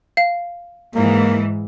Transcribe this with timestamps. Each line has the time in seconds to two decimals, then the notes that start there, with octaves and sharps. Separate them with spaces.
0.17 F5
0.95 G#2 E3 A#3